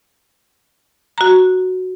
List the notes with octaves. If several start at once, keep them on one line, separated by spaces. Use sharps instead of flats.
F#4 A#5